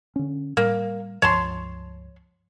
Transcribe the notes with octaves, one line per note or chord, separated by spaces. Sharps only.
D3 C#4
A2 G3 A#3
C#2 G2 F3 C#5 A5 C6